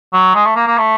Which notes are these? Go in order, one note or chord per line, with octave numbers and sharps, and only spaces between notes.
F#3
G#3
A3
A#3
A#3
A3